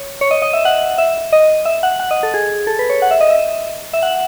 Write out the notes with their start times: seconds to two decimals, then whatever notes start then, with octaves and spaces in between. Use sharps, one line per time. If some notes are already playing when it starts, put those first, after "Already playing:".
Already playing: C#5
0.21 C#5
0.31 D#5
0.42 D#5
0.53 E5
0.65 F#5
0.98 E5
1.32 D#5
1.65 E5
1.83 F#5
2.00 F#5
2.11 D#5
2.23 A4
2.34 G#4
2.67 A4
2.79 B4
2.90 C#5
3.02 F#5
3.11 E5
3.21 D#5
3.30 E5
3.93 E5
4.03 F#5